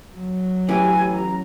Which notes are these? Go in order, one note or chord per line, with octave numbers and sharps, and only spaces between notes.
F#3
A1 E3 G4 G#5
A#5